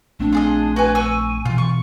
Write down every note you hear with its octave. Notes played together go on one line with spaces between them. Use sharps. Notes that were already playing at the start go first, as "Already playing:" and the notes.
A#1 A3 C4 D4
F4 G#4 D#5
F#4 B4 G#5
G#5 C#6 E6
B2 E3 F4
C#6